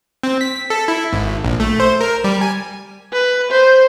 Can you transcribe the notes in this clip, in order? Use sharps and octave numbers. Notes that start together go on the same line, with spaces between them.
C4
B6
A4
E4
G#1
A#1
A3
C5
A#4
G3
G#5
B4
C5